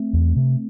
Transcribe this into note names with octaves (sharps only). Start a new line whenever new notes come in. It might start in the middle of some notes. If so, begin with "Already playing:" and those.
Already playing: A3 C4
E2
C3